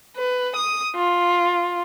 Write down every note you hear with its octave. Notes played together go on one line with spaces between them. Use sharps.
B4
D#6
F4